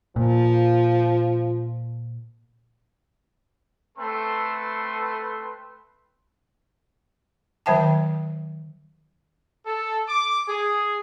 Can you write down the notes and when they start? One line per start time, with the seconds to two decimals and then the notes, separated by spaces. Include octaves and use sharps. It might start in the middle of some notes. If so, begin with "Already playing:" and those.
0.16 A#2 F3
3.98 A3 C4 A4 B4 C6
7.66 D#3 F#3 C5 E5 G5 A5
9.66 A4
10.08 D6
10.48 G#4